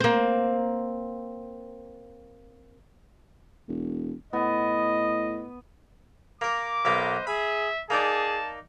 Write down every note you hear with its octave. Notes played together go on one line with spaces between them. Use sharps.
A#3 C4
E1
A2 B3 D#5
A#3 A#4 D6
B1 A#3 B3 B4 C5 D#5
G#4 E5 B5
A#3 D#4 G#4 D5 A5